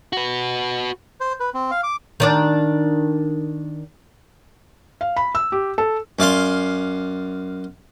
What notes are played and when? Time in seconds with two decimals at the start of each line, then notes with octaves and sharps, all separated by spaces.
0.13 F#4 B4
1.20 C5
1.40 B4
1.54 C4
1.71 F5
1.83 D6
2.20 D#3 D4 D5
5.01 F5
5.16 B5
5.35 E6
5.52 G4
5.78 A4
6.19 F#2 D5 F5 C6